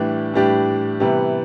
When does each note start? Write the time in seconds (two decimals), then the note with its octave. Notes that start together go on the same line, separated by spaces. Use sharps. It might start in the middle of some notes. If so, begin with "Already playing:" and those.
Already playing: A2 E3 G3 D4 G4
0.33 A2 E3 G3 D4 G4
1.00 C3 E3 G3 B3